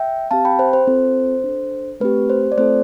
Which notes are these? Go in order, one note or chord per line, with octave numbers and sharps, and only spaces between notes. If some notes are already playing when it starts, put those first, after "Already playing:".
Already playing: E5 G5
C4 G4 F5 A5
G5 B5
C5
C5
C4 F4 A4
D4 A4
A3 C4 G4 B4
C5
D5
A3 C4 F4 A4 C5